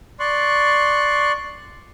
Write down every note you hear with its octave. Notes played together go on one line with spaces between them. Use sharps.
D5 C6 C#6 F#6